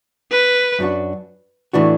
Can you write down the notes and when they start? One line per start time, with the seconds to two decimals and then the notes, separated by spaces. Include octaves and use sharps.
0.32 B4
0.79 F#2 F#3 D4 F#4
1.73 A2 E3 D4 F#4